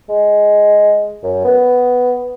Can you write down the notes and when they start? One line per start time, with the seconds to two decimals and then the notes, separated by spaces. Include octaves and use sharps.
0.09 G#3
1.23 F#2
1.44 B3